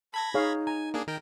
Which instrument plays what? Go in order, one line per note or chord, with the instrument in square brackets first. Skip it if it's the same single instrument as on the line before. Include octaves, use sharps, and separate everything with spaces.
[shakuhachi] A5 [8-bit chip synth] B5 G#6 A#6
[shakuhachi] D#4 [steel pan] G#4 C#5 F5
[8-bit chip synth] G#5 [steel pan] A#5
[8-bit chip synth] A#3 D4 G#4
D#3 A#4 G5